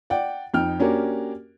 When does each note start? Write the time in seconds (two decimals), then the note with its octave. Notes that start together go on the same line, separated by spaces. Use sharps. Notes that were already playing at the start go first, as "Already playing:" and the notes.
0.10 D5 F#5 G5
0.54 F2 D#4 G5 F6
0.80 A#3 C#4 D4 F#4 G4 A#4